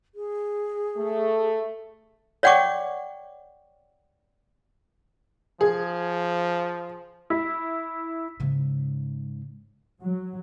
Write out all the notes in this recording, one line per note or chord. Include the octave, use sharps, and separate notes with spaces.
G#4
A3
C#5 D5 F#5 G5 C#6 D6
F3 G#4
E4
G#2 C#3
F#3